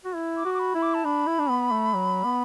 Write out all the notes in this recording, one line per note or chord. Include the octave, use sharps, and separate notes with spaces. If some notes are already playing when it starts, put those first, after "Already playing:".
F#4
E4
D6
F#4
D6
B5
E4
D6
A5
D4 B5
E4
D4
B3
A3
F#3
B3